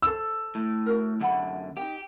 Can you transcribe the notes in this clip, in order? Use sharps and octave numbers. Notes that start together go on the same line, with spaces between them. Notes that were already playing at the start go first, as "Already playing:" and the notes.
A4 C5 E6
A2
E4 F#4 A#4
F#2 D3 G4 F#5 B5
D#4 G4 G5